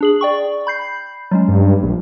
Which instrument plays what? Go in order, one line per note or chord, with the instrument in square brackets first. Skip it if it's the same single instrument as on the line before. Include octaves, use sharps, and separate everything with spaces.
[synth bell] D4 G#4 F#7
D5 G5 C#6
B5 G6 C7
F#3 G#3 C#4
[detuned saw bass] G2
A#1